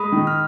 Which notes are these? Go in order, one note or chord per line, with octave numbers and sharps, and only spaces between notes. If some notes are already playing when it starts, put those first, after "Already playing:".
Already playing: G#3 B5 D#6
D#3
F6